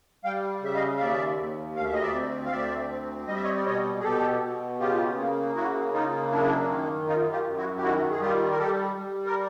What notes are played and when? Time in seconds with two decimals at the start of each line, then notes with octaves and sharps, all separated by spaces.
0.24 G3 F5 G5
0.62 C#3 E5
0.75 D#5 F5
0.97 F5
1.00 D#2 D5 E5
1.38 D#2
1.76 D2 F5
1.85 E5
1.93 D#5
2.02 D5 E5
2.14 C4
2.46 F5
2.52 D2 D5 E5
2.90 C4
3.27 G3 D#5
3.35 E5
3.43 C#5 D#5
3.57 D5
3.65 B2 C#5 D#5
4.00 G#4
4.03 B2 G4 A4
4.42 B2
4.80 C#3 F4 G4
5.17 A#3
5.55 C#3 E4 F#4
5.93 A#3 D#4 F4
6.31 F#2 D4 E4
6.68 D#3
7.07 F#2 D#4 F4
7.32 F4 G4
7.45 F#2
7.57 E4 F#4
7.77 G4
7.82 D#3 E4 F#4
8.11 G#4
8.21 G3 F4 G4
8.51 A#4
8.59 G3 G4 A4
8.96 G3
9.26 A#4